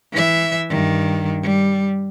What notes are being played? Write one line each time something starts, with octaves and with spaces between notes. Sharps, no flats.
E3 E5
G2 D#3
G3